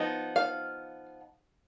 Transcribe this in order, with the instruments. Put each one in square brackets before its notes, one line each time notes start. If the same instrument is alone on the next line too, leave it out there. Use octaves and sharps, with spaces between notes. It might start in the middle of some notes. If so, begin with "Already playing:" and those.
Already playing: [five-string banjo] F3 B3 D#4
F5